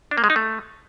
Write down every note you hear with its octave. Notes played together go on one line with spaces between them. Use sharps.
D4
A#3
G#3
D#4
A3